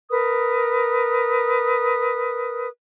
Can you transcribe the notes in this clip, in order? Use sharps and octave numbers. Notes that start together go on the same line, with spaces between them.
A#4 B4 D#6